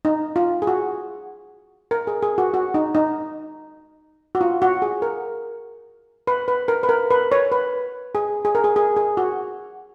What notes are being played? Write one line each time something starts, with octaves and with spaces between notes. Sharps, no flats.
D#4
F4
G#4
F#4
A#4
G#4
G#4
F#4
F#4
D#4
D#4
F#4
F4
F#4
G#4
A#4
B4
B4
A#4
B4
A#4
B4
C#5
B4
G#4
G#4
A#4
G#4
G#4
G#4
F#4